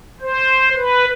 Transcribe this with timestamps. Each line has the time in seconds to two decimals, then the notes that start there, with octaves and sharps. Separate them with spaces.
0.21 C5
0.75 B4